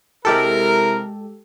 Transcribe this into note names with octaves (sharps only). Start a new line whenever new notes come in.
C3 G#3 E4 G4 A4 A#4